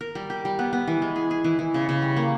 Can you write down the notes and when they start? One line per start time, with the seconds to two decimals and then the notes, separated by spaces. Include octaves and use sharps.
0.01 A#4
0.15 G3
0.30 G4
0.45 G3
0.59 B3
0.73 B3
0.87 E3
1.02 G#3
1.16 G#4
1.31 G#4
1.44 E3
1.59 E3
1.74 C#3
1.89 C#3
2.02 G3
2.17 A#3